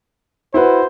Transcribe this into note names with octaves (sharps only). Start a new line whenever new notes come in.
E4 F#4 B4 C5